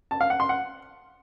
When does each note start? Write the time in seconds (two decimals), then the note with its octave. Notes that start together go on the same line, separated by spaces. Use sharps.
0.11 A5
0.21 F5
0.30 F#5
0.40 C6
0.49 F#5